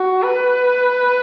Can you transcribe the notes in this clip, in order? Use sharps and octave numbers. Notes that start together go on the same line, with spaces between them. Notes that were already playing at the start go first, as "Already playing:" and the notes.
Already playing: F#4
B4